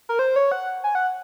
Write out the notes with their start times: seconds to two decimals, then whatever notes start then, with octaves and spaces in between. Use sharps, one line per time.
0.09 A#4
0.19 C5
0.36 C#5
0.52 F#5
0.84 G#5
0.95 F#5